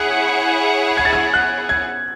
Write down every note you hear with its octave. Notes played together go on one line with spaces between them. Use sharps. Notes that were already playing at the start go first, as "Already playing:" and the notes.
Already playing: E4 G#4 C#5 F#5 F#6
G#6
A6
G#6
F#6
G#6